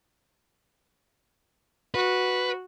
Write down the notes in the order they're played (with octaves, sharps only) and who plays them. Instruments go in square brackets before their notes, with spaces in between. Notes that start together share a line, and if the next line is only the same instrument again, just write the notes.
[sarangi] F#4 [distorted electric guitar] B4